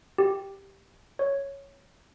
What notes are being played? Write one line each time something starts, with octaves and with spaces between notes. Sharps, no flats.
G4
C#5